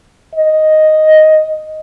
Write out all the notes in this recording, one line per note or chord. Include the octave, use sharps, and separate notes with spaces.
D#5